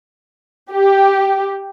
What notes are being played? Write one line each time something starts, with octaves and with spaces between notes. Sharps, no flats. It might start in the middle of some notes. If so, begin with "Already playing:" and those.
G4